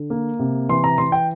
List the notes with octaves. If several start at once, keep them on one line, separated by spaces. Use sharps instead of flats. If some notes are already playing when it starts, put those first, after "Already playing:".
Already playing: D3
A#3
C3
E3 C6
A#5
E3 C6
G5